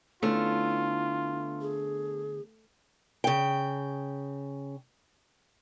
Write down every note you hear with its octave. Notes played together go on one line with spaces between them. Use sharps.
D3 A3 B3 C#4 E4 F4
G#4
C#3 G5